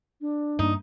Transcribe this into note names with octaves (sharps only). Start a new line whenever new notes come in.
D4
G2 A#3 D#4